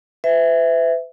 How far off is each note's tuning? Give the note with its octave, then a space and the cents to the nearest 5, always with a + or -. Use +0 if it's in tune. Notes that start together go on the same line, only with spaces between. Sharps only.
B4 +45 E5 +0